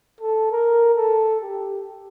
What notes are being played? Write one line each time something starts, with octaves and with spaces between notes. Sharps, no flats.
A4
A#4
A4
G4